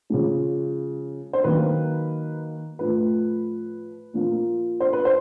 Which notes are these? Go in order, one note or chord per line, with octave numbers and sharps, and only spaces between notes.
C#3 F3 G#3
C5
D#3 F#3 A#3 B4
A2 F3 A3 B4
A#2 F3 A#3
C5
B4
C5